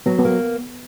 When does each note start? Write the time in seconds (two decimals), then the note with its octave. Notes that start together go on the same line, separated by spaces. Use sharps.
0.06 F#3 B3
0.19 B3
0.25 A#3